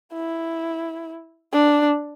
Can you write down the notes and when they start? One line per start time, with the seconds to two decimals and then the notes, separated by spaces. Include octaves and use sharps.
0.14 E4
1.53 D4